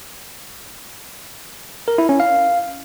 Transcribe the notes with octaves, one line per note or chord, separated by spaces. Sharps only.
A#4
E4
C#4
F5